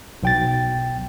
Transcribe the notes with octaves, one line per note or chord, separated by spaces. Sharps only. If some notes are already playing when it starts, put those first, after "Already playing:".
B1 G5 A6